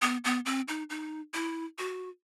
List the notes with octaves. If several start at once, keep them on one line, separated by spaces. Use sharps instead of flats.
B3
B3
C4
D#4
D#4
E4
F#4